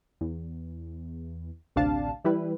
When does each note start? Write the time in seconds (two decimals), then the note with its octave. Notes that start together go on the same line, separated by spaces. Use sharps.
0.21 E2
1.76 A1 D2 C3 D4 F5 A5
2.24 E3 G3 E4 B4